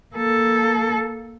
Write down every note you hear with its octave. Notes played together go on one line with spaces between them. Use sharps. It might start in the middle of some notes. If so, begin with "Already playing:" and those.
A#3 A4